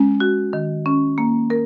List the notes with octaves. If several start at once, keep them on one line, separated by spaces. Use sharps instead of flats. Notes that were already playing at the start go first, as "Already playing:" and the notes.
Already playing: G#3 C#4
F#4
D#3
C#4
A#3
A#4